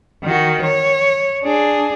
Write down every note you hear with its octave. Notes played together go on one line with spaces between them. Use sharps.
D#3 F#4
C#5
D4 G#4